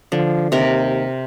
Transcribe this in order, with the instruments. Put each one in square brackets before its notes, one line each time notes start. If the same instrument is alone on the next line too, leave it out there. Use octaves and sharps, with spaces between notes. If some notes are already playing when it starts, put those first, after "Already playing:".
[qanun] D3 [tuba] F3
[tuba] D#2 [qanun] C3 A#4